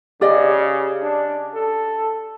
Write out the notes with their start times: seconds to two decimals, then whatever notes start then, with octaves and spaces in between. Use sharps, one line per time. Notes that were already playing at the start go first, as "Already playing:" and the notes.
0.21 C#3 G4 D5 D#5
1.02 D4
1.54 A4